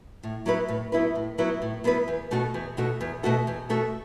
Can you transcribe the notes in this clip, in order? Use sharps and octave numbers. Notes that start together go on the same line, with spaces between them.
A2
F#3 B3 E4 B4
A2
F#3 B3 E4 B4
A2
F#3 B3 E4 B4
A2
F#3 B3 E4 B4
E2
B2 A3 F#4 A4
E2
B2 A3 F#4 A4
E2
B2 A3 F#4 A4
E2
B2 A3 F#4 A4